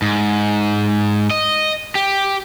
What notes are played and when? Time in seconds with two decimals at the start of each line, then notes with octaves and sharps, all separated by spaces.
0.02 G#2
1.31 D#5
1.95 G4